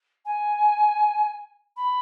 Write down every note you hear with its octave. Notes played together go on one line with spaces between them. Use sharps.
G#5
B5